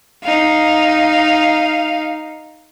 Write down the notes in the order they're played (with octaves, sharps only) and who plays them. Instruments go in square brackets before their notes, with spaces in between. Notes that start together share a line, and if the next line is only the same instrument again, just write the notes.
[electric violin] D#4 F5